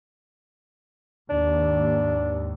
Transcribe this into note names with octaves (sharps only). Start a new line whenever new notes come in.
D#2 G#2 D4